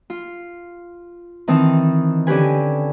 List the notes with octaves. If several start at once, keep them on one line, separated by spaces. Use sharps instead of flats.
F4
D#3 E3 C4 D#4 A5
D3 C#4 G4 B4 G#5